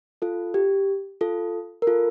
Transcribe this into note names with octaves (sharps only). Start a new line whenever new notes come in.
F4 A4
G4
F4 A4
A#4
F4 A4